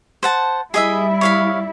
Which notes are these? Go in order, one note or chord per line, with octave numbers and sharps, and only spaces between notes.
C5 F#5 A5
G3 E4 G#4 D#5 E5
C#5 F5 B5